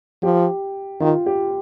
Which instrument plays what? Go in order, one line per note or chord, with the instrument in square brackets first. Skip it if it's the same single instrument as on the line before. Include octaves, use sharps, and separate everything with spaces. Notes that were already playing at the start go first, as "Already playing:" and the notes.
[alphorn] F3 [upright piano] G4
[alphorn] D#3 [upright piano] F4
[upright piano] G4